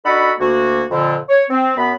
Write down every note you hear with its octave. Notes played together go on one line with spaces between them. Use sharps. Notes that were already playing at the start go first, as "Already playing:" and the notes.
D4 D#4 F#4 A4 F#5 B5
D2 A#3 F#4
F2 A#2 D3
C#5
C4
F#2 B3 B5